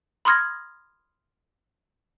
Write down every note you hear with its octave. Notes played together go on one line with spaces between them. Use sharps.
B5 C6 D#6 F6 G#6 A#6